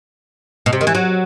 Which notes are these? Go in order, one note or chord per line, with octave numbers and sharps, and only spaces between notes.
B2
C3
D#3
E3
F#3